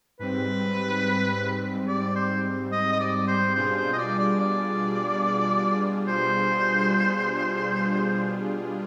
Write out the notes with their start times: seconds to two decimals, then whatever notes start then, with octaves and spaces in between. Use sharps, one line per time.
0.19 G#2 G3 C4 B4
1.87 D5
2.16 C5
2.72 D#5
2.92 D#5
3.00 D5
3.28 C5
3.56 B2 G3 D4 F4 G#4 C5
3.76 C5
3.93 D#5
3.98 D5
4.19 D5
4.40 D5
6.08 C5